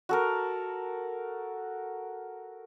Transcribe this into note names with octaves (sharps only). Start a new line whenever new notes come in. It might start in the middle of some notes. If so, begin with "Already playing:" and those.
F#4 A4 A#4